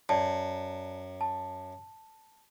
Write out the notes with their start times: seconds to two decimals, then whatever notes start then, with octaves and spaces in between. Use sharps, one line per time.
0.09 F#2 D5 A5
1.21 A5